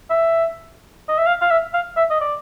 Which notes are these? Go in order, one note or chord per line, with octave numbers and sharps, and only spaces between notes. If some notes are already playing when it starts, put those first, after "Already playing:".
E5
D#5
E5
F5
F5
E5
F5
E5
D#5
D5